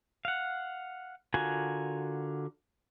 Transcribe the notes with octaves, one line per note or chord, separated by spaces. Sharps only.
F5 F#5
D3 F4 F#4 A#4 G#5